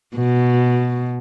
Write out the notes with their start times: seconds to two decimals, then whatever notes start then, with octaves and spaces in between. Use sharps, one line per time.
0.15 B2